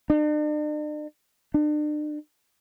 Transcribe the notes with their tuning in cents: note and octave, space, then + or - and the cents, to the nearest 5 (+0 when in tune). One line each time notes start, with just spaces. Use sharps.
D4 +45
D4 +40